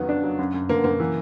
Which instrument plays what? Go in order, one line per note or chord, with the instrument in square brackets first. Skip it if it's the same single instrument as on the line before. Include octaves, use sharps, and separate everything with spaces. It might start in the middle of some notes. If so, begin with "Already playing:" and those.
Already playing: [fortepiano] F2 D#3 F#3 [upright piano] B3
[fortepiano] D4
F#3
F#2
F#2
[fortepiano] D3 [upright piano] A#3
[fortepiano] F#2 [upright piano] A#3
[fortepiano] E3